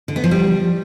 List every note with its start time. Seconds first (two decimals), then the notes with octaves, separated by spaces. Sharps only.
0.08 D3
0.16 B3
0.24 F3
0.31 G3